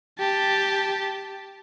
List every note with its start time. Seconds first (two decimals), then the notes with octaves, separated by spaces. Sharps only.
0.18 G4 A5